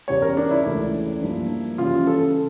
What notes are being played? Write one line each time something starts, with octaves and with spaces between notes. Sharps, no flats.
E2 C#3 G3 C#5
A#4
D4
E4
C#2 C#3 E3 A3 D4
G2 F3 A#3 D4
C#3 E3 G3 C#4 F4
A4